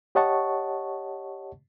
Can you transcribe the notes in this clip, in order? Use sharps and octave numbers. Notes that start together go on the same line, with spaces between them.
G4 C#5 D#5 F#5 A5 C#6